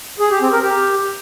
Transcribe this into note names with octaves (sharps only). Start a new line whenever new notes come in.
G#4
G4
C4
A#4
G4